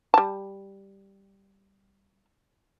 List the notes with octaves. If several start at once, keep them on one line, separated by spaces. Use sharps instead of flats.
G3 A5